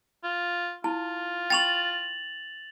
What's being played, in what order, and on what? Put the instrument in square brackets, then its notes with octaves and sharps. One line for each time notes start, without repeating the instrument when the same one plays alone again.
[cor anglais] F4
[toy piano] E4 A5 [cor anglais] F4
[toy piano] G5 B5 C#6 [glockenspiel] A6 F7 F#7